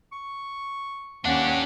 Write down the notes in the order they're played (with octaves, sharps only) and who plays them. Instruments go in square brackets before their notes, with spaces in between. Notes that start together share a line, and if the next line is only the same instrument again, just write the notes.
[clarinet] C#6
[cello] D#2 C#4 [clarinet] A#3 [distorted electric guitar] D4 G4 [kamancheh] F#5